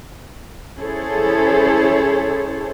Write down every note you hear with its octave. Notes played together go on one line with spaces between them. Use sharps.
C#4 E4 G#4 A4 C5 C#5